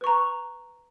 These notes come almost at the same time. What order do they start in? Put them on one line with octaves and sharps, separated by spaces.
B4 C#6 A#5